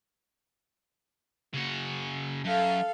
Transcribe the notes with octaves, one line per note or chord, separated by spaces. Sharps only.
C#3 F#4
F#2 A4 F5